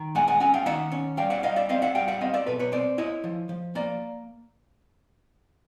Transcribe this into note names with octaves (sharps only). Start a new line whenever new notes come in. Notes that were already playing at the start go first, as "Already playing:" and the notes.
Already playing: D#3
G#3 F#5 G#5
F#5 G#5
C#4 F#5 G#5
F5 G5
D#3 E5 F#5
C#4
G3 F5 G5
E5 F#5
G3 D#5 F5
D5 E5
C4 D#5 F5
E5 F#5
G3 F5 G5
E5 F#5
C4 D#5 F5
D5 E5
B2 A4 B4
B4 C#5
C4 C5 D5
E4 C#5 D#5
F3
F3
A#3 D5